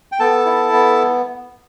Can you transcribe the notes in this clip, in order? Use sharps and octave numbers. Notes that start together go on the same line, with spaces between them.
G5
B3 A4 A5
E4
B3